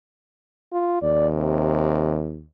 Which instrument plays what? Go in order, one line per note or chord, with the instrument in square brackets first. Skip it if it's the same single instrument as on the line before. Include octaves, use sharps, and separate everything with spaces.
[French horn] F4
[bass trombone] D#2 [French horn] D5
[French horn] C3